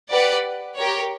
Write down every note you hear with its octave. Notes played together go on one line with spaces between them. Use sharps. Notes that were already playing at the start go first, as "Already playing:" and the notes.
G4 B4 D5 F#5
G4 A#4 C#5